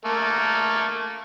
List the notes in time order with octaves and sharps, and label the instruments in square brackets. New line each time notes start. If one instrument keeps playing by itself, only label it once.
[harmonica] A3 A#3